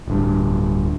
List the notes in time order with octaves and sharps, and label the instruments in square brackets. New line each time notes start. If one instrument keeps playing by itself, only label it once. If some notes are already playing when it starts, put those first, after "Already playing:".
[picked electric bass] D1 G2